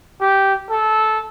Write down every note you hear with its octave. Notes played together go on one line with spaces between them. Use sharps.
G4
A4